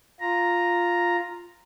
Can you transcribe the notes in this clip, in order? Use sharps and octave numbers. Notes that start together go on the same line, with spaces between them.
F4 A#5